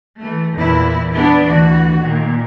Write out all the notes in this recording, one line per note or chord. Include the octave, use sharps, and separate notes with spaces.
E3 A3
E2 A#2 E3 E4
B3 D4 E4
D2 E3 F#4
A#2 D#3